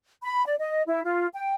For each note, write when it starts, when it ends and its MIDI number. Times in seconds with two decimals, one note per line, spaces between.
0.22 0.44 83
0.45 0.55 74
0.59 0.82 75
0.86 1.01 64
1.04 1.26 65
1.33 1.55 79